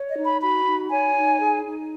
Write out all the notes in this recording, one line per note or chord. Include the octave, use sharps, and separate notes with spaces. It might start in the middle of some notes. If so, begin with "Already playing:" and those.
Already playing: C#5
D#5
D#4
B5
F#4 B5
D#4
C#5 G#5
D#4
G#4
D#4